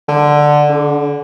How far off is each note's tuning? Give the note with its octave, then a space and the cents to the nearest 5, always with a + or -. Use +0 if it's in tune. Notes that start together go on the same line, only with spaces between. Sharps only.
D3 +10
D3 -35